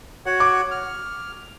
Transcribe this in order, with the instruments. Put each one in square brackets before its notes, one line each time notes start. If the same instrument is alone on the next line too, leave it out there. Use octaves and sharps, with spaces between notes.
[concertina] F#4 C#5 F#5
[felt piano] D6
[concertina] F6